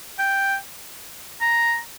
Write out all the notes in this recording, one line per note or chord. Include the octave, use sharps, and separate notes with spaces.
G5
A#5